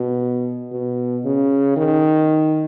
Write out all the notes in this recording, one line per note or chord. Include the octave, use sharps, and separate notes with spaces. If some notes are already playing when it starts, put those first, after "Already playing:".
Already playing: B2
B2
C#3
D#3